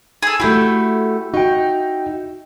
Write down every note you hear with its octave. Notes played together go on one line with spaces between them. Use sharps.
G#4 A4
A3 E4 F#4 G4
D#4 F#4 G5